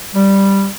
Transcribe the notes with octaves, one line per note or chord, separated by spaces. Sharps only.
G3